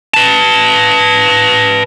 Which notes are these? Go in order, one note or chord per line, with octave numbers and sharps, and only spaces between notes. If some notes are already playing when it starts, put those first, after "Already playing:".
B4 A5